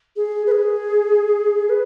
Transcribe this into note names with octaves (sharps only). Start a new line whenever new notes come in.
G#4
B4
G#4
B4